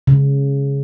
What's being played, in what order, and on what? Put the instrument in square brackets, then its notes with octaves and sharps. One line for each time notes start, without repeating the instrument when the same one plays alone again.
[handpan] C#3